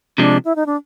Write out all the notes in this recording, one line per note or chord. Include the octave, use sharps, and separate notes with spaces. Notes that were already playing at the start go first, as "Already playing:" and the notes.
C3 F3 G#3 D4
E4
D#4
D4